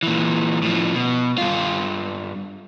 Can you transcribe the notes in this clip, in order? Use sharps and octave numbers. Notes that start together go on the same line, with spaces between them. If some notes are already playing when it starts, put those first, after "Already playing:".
A#2 E3
A2 F3
B2
G2 F4